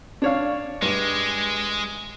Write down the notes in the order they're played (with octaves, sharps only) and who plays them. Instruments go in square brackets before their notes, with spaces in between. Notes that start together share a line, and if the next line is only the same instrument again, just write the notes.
[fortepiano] D4 C#5 F5
[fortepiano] G2 [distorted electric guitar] G#3